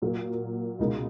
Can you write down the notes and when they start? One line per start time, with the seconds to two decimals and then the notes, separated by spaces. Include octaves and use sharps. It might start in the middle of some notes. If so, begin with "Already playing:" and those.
0.02 A#2 F#3 A#3
0.79 C#2 B2 G#3 D#4 A#4